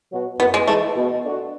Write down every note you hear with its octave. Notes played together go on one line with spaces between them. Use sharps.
B2 F#3 B3 F#4
F#2 B3
G#3
E3 G#3 A3
B2
A3 D4 F#4